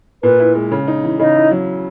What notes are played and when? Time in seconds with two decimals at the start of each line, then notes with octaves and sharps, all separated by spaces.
0.23 A#2 B4
0.39 E4
0.55 G#3
0.71 C#3
0.87 D#4
1.04 E3
1.19 C#3 D#4 D#5
1.35 E4
1.51 F#3